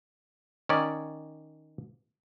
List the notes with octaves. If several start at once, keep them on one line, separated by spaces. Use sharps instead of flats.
D#3 C#4 D5